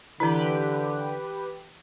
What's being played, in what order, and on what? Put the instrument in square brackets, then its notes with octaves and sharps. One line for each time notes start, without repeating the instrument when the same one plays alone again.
[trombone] D3 [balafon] E3 E4 [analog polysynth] G4 B4